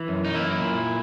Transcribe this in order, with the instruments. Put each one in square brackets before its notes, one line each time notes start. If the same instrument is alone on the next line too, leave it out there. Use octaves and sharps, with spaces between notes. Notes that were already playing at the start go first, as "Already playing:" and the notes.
Already playing: [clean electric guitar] E3
F#2
D#4
A#3 E4
A#2